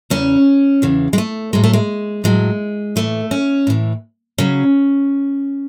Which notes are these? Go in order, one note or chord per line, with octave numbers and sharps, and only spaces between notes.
E2 C#3 E3 C#4
E2 C#3 E3
G#3
A3
A2 F#3 G#3
A3
G#3
A2 F#3 G#3
A2 E3 A3
C#4
A2 E3
C#3 F#3 C#4